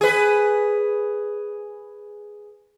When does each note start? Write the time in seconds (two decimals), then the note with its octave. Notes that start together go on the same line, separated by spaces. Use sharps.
0.01 G#4 B4